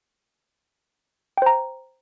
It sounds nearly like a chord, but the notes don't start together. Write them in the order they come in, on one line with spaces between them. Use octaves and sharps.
G5 C5 A#5